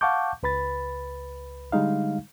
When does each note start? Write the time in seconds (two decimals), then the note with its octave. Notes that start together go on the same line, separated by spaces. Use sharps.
0.01 F5 F#5 A5 C#6 D6 G6
0.43 C#2 B4 B5 A6
1.72 D3 G3 G#3 D#4 F5